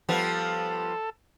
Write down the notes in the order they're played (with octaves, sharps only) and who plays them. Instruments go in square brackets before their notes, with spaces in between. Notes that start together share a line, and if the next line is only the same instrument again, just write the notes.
[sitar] F3 G3 B3 [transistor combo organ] A4